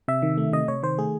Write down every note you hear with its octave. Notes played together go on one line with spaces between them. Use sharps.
C3 E5
D#3
A3
C3 D#5
C3 C#5
D#3 C5
A3 G#4